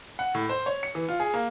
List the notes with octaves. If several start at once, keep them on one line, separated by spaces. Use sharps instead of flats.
F#5
A2
C5
C#5
C#7
E3
F4
G#4
A#3